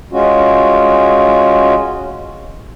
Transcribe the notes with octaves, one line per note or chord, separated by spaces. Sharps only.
G#3 C#4 F4 F#4